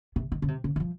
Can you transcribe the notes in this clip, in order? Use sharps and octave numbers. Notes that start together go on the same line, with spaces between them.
C3
D#3
C#3
C3
C#3
D#3
F3